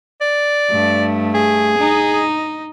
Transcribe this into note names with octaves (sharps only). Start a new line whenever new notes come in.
D5
G2 A3
G#4
D#4